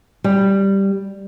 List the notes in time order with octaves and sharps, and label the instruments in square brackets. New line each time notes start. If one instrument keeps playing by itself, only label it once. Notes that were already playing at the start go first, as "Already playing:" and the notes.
[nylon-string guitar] G3